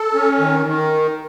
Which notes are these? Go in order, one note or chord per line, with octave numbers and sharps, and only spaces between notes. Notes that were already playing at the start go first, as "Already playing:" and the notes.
Already playing: A4
C#4
D#3
D#3